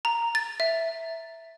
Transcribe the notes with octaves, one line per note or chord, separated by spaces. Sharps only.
A#5
A6
E5